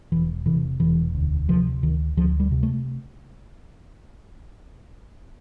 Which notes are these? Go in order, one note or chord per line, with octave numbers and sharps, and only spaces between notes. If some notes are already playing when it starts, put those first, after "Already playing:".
E1 E3
C3 E3
E1 E3
D2
C3 F3
D2 D#3
D2 F3
G3
C3
A3